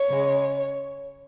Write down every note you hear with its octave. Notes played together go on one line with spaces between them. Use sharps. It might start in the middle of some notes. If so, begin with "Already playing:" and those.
Already playing: C#5
C#3 G#3